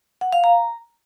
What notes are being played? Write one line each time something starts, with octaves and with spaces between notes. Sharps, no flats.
F#5
F5
A#5